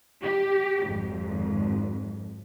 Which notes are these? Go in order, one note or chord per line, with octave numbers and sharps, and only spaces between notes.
G4
G#1 F2